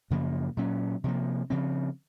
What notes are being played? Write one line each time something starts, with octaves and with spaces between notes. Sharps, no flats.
F#2 C#3 F3 A#3
A#2 F#3 C#4
C3 F3 A#3
C#3 F3 C4